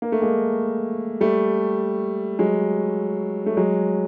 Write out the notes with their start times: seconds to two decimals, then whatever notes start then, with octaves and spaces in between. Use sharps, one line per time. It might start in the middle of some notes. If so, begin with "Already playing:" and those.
0.02 A#3
0.12 A3
0.22 G#3 A#3
1.21 G3 A3
2.39 F#3 G#3
3.46 A3
3.57 F#3 G#3